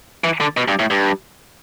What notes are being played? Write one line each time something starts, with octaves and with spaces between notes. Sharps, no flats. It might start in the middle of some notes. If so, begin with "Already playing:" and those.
E3
D3
B2
G2
A2
G2